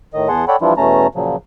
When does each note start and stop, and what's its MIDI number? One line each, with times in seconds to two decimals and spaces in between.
0.14 0.28 45
0.14 0.28 51
0.14 0.28 75
0.29 0.45 40
0.29 0.45 59
0.29 0.45 68
0.29 0.45 78
0.29 0.45 81
0.29 0.45 84
0.48 0.56 69
0.48 0.56 73
0.48 0.56 74
0.48 0.56 78
0.48 0.56 79
0.48 0.56 83
0.61 0.74 52
0.61 0.74 53
0.61 0.74 55
0.61 0.74 62
0.61 0.74 64
0.61 0.74 65
0.77 1.07 40
0.77 1.07 47
0.77 1.07 57
0.77 1.07 61
0.77 1.07 81
0.77 1.07 82
1.15 1.36 46
1.15 1.36 49
1.15 1.36 53
1.15 1.36 54